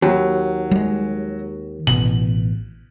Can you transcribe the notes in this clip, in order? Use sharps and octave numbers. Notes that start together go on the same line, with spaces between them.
D#2 F#3
G3 G#3
A1 B2 F#7